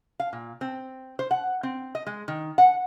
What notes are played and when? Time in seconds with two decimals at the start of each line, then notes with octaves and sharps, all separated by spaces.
0.20 F5
0.33 A#2
0.61 C4
1.19 C5
1.31 F#5
1.63 C4
1.95 D#5
2.07 G#3
2.28 D#3
2.58 F#5